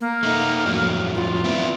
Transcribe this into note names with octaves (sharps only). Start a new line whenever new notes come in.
A#3
A3 D#4
F2 A2 F#3
F4
B3 C4 E4